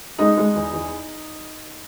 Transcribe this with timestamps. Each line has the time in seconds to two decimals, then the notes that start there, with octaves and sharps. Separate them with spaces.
0.18 G#3 D#4
0.37 G#3
0.55 E2
0.73 E2